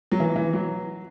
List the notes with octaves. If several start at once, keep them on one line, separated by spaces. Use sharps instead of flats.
F#3
E3
E3
F#3